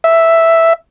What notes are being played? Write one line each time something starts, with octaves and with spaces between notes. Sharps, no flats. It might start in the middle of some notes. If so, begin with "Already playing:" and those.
E5